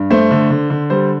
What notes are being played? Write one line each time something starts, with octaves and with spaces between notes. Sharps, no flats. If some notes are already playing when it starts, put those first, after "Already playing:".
Already playing: G2
A3 C5
D3
D3
D3
G3 C5